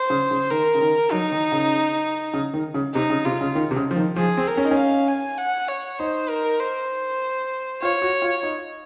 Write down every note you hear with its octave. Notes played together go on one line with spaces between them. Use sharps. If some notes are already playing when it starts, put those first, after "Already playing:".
Already playing: C5
C#3
C#3
D#3 A#4
C#3
D#3
F#3 D#4
D#3
C#3
C#3
D#3
C#3
C3 D#4
C#3
C3 F4
C#3
D#3
C3
C#3
F3
D#3
F3 G#4
C4
A#4
C#4
D#4
C#4
F5
G#5
F#5
C#5
D#4 C5
A#4
C5
F4 C#5
F#4
F4
D#4